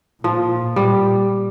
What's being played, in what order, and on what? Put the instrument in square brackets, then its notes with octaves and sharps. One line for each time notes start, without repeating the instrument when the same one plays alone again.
[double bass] A#2 [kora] F3
[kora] G3